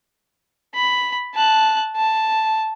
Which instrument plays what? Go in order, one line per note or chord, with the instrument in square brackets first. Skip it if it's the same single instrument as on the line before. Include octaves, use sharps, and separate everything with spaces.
[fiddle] B5
A5 F#6
A5